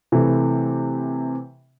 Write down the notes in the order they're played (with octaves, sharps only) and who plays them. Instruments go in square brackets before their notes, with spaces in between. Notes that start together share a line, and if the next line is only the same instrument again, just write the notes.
[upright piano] C3 E3 A3